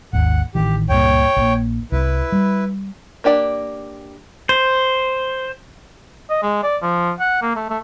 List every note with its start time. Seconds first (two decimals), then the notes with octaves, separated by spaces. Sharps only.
0.13 G#1 D#2 F#5
0.55 A1 D#3 E3 G4
0.89 C#2 G2 A#2 C#5 G5
1.36 A#1 A#2
1.92 C2 E4 B4
2.32 G3
3.24 A#3 D4 G4 D5 G5
4.49 C5
6.29 D#5
6.42 G#3
6.63 D5
6.82 F3
7.19 F#5
7.42 A#3
7.55 A3
7.70 A3